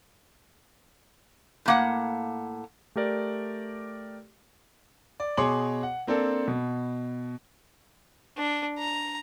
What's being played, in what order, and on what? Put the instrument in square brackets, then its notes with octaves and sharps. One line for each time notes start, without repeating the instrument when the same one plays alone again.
[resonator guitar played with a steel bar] A2 A#3 F#5
[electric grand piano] A3 G4 A#4 D5
[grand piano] D5
B2 G#4 C#5 C6 D6 F#7
F#5
A#3 C4 D4 A4
B2
[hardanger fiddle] D4
A#5